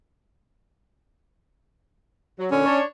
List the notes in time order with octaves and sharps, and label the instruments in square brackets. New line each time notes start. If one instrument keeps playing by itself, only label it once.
[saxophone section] F#3
[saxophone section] A#2 D3 [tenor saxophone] C#4
[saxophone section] D4 C#5